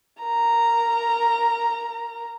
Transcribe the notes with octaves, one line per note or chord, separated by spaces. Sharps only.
A#4 A#5